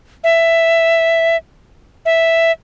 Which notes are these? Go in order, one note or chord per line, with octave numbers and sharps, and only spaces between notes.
E5
E5